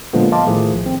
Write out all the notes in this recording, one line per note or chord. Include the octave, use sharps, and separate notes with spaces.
A#2 D3 F3 G#3 A#3 B3
D#5 F5 A5 C6 D6
A2 D#3 F3 A3 E4 G#4
A#1
C4